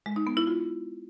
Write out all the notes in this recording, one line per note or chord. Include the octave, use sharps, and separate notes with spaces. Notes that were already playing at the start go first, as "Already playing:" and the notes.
G#3
D#4
B3
E4
F4